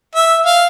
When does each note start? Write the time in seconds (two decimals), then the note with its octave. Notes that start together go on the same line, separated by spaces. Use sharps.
0.15 E5
0.46 F5